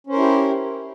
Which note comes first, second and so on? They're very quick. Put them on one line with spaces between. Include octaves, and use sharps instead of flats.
C#4 C5 A#4 E4 G4